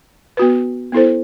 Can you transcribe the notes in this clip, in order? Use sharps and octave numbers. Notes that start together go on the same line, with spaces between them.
B3 F#4 B4
B3 E4 A4 C5